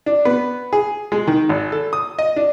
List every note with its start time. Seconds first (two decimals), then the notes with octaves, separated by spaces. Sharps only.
0.06 D4
0.25 B3
0.73 G#4
1.12 G#3
1.27 D#3
1.49 G#1
1.72 A4
1.93 D#6
2.19 D#5
2.36 D4